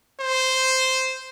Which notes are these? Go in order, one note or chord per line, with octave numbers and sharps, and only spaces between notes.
C5